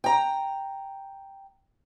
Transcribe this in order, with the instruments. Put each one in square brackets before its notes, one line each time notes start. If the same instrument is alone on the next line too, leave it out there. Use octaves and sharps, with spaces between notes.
[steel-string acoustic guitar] G5 A#5